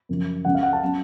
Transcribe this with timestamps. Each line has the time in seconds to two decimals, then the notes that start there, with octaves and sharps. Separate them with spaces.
0.09 F#2 C#3 F3
0.45 C#2 C#3 G#3 C#4 F#5
0.55 F5
0.63 F#5
0.73 A5
0.83 F#3 C#4